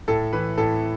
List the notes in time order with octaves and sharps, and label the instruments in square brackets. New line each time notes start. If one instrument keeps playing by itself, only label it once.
[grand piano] A2 A4
E3 B4
A2 A4